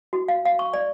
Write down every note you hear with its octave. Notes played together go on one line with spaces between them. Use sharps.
F#4
F5
F5
C#6
D5